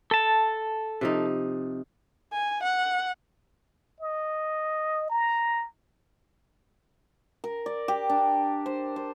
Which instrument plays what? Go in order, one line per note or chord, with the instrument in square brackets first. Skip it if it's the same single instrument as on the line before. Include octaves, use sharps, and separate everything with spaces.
[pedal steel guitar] A4 A5
[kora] C3 F3 D#4
[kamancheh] G#5
F#5
[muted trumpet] D#5
A#5
[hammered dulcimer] A#4
D5
G4
D4
C5
C5